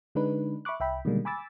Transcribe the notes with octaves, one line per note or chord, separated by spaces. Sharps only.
D3 G#3 D4 D#4 B4
E5 B5 C#6 D6 F#6
C2 E5 G5 B5
B2 D3 D#3 G3 G#3 A#3
G#5 B5 D6 E6 A6